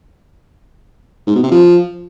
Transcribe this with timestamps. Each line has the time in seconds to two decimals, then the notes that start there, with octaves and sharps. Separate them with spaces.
1.27 G#2
1.35 B2
1.43 C3
1.51 F3